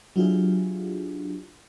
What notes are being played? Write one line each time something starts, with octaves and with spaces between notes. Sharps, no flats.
F#3 D4 E4 F4 G4 G#4